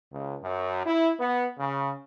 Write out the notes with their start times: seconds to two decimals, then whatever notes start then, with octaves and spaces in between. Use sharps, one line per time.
0.12 C#2
0.43 F#2
0.85 E4
1.19 B3
1.59 C#3